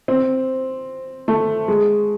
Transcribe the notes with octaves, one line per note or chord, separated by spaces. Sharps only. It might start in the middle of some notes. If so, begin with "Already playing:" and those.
C4
A3
G#3